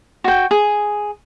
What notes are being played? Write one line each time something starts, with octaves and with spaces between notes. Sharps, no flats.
F#4 G5
G#4